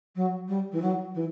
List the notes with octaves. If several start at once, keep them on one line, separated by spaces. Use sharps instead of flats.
F#3
G3
E3
F#3
E3